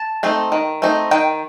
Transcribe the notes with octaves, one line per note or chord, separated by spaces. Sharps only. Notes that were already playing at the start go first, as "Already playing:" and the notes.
Already playing: A5
A3 C4 D#4
D#3
A3 C4 D#4
D#3 G5